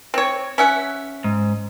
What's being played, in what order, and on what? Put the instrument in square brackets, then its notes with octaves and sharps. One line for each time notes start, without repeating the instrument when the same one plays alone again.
[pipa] C4 C#5
C#4 E5 F#5
[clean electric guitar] G#2